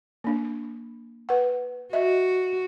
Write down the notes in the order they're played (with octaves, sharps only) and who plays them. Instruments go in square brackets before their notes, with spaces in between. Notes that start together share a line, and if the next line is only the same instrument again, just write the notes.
[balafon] A#3 D4
B4 F#5
[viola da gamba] F#4 [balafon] D#5 E5